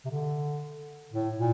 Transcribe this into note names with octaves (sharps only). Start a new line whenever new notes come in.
C3
D3
A2
A#2